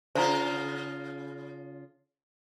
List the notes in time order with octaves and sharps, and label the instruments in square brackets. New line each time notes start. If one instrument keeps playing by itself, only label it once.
[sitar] C#3 F4 [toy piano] C5 F5 A#5